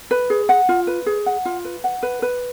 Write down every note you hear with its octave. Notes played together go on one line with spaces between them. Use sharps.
B4
G#4
F#5
F4
B4
G#4
F#5
F4
B4
F#5
B4
B4